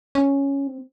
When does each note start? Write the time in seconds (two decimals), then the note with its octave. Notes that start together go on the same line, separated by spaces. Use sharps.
0.15 C#4
0.67 C4